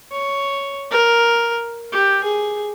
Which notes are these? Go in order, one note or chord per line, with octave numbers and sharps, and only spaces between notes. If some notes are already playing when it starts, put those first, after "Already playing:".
C#5
A#4
G4
G#4